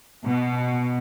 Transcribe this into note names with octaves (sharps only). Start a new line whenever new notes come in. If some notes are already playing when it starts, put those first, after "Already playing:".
B2